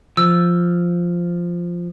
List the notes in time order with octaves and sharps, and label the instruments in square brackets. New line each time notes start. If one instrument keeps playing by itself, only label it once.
[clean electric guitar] F3 [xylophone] E6